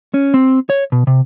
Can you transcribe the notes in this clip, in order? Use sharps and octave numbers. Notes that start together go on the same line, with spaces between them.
C#4
C4
C#5
B2
C3